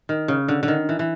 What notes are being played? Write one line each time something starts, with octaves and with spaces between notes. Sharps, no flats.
D#3
C#3
D3
D3
D#3
E3
E3